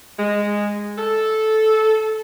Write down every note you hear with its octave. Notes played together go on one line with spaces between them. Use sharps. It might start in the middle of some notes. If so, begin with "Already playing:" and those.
G#3
A4